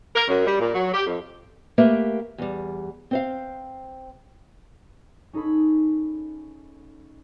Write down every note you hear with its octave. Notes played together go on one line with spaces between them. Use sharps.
A#4
F#2
G3
A#2
F#3
G4
F2
A3 A#3 G4 A#4 B4 E5
E2 G3
C4 C5 F5
C#4 D#4 G#4 A4 B5